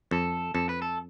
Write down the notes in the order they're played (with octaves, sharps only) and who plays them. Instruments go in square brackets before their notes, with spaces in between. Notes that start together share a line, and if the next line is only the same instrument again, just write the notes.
[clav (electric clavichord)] F2 [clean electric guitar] A4
[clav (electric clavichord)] F2 [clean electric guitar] A4
[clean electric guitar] B4
A4